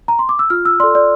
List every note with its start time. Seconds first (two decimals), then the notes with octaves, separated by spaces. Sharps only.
0.08 A#5
0.19 C6
0.29 D6
0.39 E6
0.50 F4 F6
0.65 E6
0.80 A4 D5 C6
0.95 D5